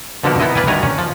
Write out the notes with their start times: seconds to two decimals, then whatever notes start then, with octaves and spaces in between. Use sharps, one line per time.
0.24 B2 D3 F3 A#3 F#4 G4
0.40 B3 D#4 E4 D#5
0.55 B4 D5 F5 G5 G#5
0.67 D2 D#3 G3 F#5 G#5 A#5
0.83 C#4
0.98 F3